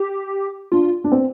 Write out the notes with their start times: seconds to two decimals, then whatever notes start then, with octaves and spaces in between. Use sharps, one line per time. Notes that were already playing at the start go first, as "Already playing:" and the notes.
Already playing: G4
0.72 D4 F4
1.04 D4
1.12 C4